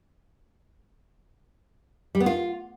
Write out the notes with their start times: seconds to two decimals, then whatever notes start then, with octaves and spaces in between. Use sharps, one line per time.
2.15 G3
2.20 B3
2.26 F4